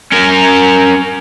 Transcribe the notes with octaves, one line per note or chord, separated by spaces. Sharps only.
C#4 A#4